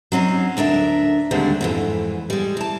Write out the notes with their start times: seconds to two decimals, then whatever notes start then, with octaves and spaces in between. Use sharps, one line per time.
0.12 F#3 C4 C#4 D#4
0.57 D2 D4 A#4 E5
1.31 D#2 D3 G3 G#3 C4 D4
1.61 F2 G#2 E3
2.30 G3 G#3
2.57 E3 A5